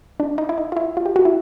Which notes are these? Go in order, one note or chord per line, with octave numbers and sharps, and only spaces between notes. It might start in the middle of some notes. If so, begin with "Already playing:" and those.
D4
D#4
E4
D#4
F4
E4
F4
G4
F#4
E4